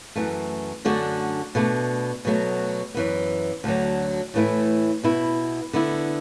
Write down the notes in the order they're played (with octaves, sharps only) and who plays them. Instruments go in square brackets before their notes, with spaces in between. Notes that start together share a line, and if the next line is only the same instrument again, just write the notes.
[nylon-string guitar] F#2 E3 A3
F#2 D3 A3 D4 F#4
B2 A3 D4
B2 F#3 A3 F#4
F#2 E3 B3
D2 D3 F#3
A2 E3 A3 E4
B2 B3 E4
D3 B3 E4